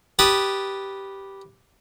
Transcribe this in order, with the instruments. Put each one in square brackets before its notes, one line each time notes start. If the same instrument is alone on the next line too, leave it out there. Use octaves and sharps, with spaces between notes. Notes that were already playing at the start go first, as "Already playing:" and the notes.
[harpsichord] G4 B4 A5 D#6